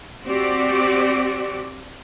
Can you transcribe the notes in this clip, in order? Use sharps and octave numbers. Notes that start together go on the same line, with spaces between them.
C4 F#4 G4 D5